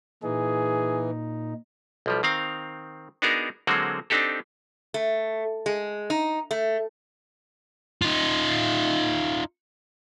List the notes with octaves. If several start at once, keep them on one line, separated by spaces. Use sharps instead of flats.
A#2 E3 D#4 G#4
B1 F3 G3
D#3 C4 F5 A#5
B3 D4 D#4 F#4 G#4 A#4
D3 F#3 G#3 A#3 C4 F#4
C4 D4 D#4 G4 A4
A3
G#3
D#4
A3
D#4 F4